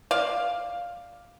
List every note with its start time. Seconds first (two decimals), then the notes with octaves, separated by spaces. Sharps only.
0.11 D5 F5